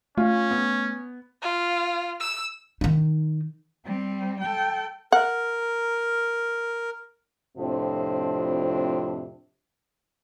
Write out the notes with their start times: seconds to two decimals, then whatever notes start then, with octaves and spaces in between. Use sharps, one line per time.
0.18 A3 C#4 F4
0.51 B3
1.42 F4
2.20 E6
2.81 D#3 D#4
3.85 G3 C4
4.41 A4 G5
5.12 A#4 F#5
7.58 F2 A2 C3 F3 C4 D4